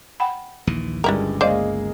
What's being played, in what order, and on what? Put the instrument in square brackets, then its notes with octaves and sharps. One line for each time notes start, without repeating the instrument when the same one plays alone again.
[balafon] F#5 G5 B5
[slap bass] A#1 D#2 E3
[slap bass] G1 C#2 [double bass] G2 G#3 [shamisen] D4 E4 A#4
[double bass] G#3 A#3 [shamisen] C5 D5 [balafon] D#5 F5